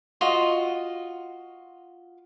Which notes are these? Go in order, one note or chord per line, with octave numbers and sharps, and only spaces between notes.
F4 F#4 D#5